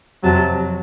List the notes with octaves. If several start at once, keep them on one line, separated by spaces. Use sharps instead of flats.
F2 C3 F#3 A5